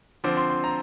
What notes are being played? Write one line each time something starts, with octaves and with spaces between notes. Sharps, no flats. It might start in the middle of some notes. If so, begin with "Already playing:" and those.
D3 F3 C4 D6
C6
C6
A#5